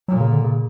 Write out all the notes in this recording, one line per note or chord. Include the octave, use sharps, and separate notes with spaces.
A#2 F#3
C#3
D3
C#3